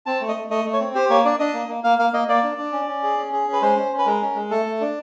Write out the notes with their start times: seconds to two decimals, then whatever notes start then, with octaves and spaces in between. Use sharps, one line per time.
0.06 C4 A5
0.21 A3
0.29 D#5
0.36 A3
0.50 A3 D#5
0.65 A3
0.73 C#5
0.80 C4
0.95 G4 C5
1.10 A#3 C#5
1.25 D4 D5
1.39 D4 D#5
1.54 A#3
1.69 A#3
1.84 A#3 F5
1.99 A#3 F5
2.13 A#3 D#5
2.28 A#3 D5
2.43 D4
2.58 D4
2.72 C#4
2.88 C#4
3.03 G#4
3.17 C#4
3.33 G#4
3.48 C#4
3.53 B4
3.62 G#3 C5
3.77 C#4
3.92 C#4
3.98 B4
4.06 G#3 A#4
4.22 C#4
4.35 G#3
4.51 A3 A4
4.66 A3
4.81 D4